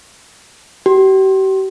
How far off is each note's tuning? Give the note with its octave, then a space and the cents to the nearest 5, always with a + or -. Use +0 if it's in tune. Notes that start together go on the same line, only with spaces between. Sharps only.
G4 -40